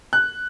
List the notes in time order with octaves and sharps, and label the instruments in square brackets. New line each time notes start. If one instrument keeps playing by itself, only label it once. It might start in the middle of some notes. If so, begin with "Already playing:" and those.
[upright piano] F#6